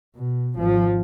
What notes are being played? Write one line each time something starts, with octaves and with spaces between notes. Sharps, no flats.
B2
G#1 F3